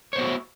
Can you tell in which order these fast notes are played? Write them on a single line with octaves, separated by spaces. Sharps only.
C#5 C5 B3 F#4 E4